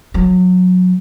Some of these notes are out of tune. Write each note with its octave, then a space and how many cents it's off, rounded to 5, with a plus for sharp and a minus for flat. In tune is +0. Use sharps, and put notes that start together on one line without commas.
F#3 -20